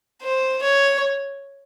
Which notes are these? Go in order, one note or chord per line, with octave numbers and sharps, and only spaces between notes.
C5
C#5